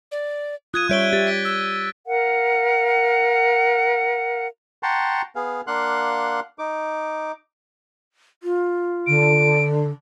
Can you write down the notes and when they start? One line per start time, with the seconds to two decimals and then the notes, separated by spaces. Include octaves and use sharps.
0.12 D5
0.74 F4 D#6 F#6 G#6 D#7
0.89 G3 C#5 E5 G6 D7 G7
1.13 G4 A6
1.27 B6 D7
1.45 E6
2.06 A#4 F5 F#5
4.83 F#5 G5 A5 A#5 C6 C#6
5.36 B3 G#4 F5
5.67 A#3 D4 F5 F#5 C6 F#6
6.59 D#4 D6
8.43 F4
9.07 D3 D7